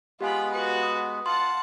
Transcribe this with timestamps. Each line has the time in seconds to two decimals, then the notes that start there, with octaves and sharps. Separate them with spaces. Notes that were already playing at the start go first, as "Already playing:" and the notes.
0.21 G#3 B3 F4 G4 F5 G#5 B5
0.52 F#4 B4
0.83 D#6
1.26 F4 F#5 A5 C6